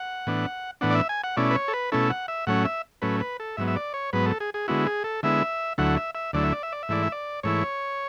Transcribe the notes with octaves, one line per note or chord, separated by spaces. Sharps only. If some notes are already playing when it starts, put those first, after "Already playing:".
Already playing: F#5
A2 E3 B3 D4
A2 E3 B3 D4 F#5
D5
E5
G#5
F#5
B2 A3 C#4 E4 D5
B4
C#5
A4
B4
B2 A3 C#4 E4 A4
F#5
E5
A2 F#3 A3 C#4 F#5
E5
A2 F#3 A3 C#4 B4
B4
A4
G#2 F#3 B3 E5
E5
D5
C#5
G#2 F#3 B3 B4
A4
G#4
G#4
D3 G#3 B3 E4 F#4
G#4
A4
D3 G#3 B3 E4 E5
D2 D3 F#3 A3 E4 F#5
E5
E5
D2 D3 F#3 A3 E4 D5
E5
D5
E5
D5
E5
G#2 E3 A3 E4 D5
E5
D5
G#2 E3 A3 E4 C#5